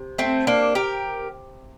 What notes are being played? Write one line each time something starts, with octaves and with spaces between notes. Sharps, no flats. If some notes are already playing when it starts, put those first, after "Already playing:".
Already playing: C3
A3 C4
A#3 D4
G4 A#4